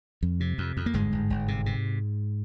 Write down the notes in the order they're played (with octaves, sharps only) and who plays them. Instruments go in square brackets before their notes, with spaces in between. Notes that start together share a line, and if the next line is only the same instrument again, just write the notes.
[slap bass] F2
C3
F2
F2
A#3
G1 G#2 G#3
G1
G1
C3
C3